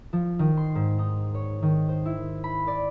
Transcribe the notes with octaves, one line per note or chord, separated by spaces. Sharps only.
F3
D#3
C6
G#2
D#4
C#5
D#3
C5
E4
B5
D5